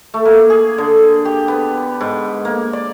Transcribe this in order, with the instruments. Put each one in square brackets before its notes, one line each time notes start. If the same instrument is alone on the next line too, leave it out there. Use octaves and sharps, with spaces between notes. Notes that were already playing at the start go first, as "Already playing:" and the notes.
[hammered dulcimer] A3
A#3
G#4
D3
G4
B3
G#2
A#3
D5